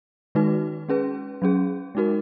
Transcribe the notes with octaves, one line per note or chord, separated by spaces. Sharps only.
D#3 G#3 D#4 F#4 B4
G#3 C#4 G#4 B4
F#3 C#4 G#4
G#3 D#4 F#4 A#4